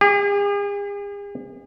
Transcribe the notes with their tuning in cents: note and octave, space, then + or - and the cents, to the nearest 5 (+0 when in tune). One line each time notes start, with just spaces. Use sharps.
G#4 -45